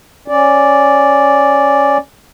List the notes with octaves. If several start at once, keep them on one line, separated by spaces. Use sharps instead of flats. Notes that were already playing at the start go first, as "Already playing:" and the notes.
C#4 D5